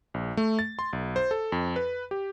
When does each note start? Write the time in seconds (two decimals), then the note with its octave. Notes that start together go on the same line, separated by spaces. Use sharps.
0.14 A#1
0.37 A3
0.59 A6
0.79 C6
0.93 B1
1.16 C5
1.31 A4
1.52 F2
1.76 B4
2.11 G4